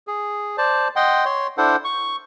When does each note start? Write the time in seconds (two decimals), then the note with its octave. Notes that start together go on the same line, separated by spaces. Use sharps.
0.07 G#4
0.58 C5 D5 A5
0.96 D#5 F#5 G5 C6
1.25 C#5 C6
1.58 D4 E4 A4 C5 F#5
1.85 C#6